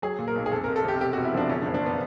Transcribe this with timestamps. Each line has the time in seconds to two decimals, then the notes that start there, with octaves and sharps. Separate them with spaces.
0.02 F#3 G#4
0.19 A#2
0.28 A#4
0.36 B1
0.46 G#4
0.51 F2 A4
0.64 A#4
0.68 F1
0.76 A4
0.85 C3 G4
1.01 E1 G4
1.13 F#4
1.17 E1
1.25 E4
1.34 F3 D4
1.49 C#3 C#4
1.62 D4
1.66 F#1
1.74 D4
1.86 B3